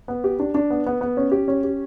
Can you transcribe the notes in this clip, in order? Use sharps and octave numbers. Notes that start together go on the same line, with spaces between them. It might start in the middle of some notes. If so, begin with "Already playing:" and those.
B3
G4
D4
D4
B3
B3
B3
C#4
G4
C#4
G4